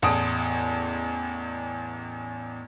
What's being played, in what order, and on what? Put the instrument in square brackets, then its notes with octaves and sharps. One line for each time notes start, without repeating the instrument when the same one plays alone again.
[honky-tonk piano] A1 E2 A5 D#6 D7